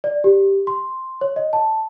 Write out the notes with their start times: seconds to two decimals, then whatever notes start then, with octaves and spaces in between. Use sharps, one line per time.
0.04 D5
0.24 G4
0.67 C6
1.21 C#5
1.36 D#5
1.53 A5